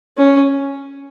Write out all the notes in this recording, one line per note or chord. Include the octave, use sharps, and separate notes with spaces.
C#4